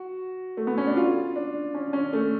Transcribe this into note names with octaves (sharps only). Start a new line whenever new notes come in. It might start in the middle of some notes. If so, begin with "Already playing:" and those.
Already playing: F#4
A3
B3
C#4
D4
F4
D4
C#4
C#4
A3